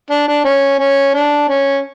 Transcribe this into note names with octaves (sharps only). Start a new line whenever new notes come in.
D4
D4
C#4
C#4
D4
C#4